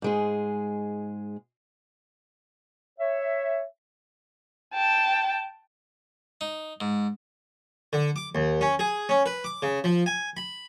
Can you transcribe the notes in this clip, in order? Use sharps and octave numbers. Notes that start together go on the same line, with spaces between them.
G#2 G#3 G#4
C#5 E5
G5 A5
D#4
G#2
D3
D6
D#2
C#4
G#4
C#4
B4
D6
C#3
F3
G#5
B5